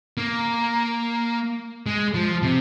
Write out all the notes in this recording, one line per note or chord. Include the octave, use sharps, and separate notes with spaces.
A#3
G#3
F3
C3